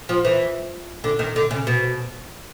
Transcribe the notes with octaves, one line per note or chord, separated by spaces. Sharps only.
F3
E3
D3
D#3
D3
C#3
B2